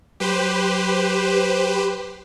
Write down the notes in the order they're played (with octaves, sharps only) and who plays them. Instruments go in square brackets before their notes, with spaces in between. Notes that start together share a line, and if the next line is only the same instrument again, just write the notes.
[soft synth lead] F#3 [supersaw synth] G4 B4 C5